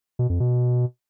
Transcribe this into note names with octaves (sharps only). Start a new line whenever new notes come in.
B2
F2
B2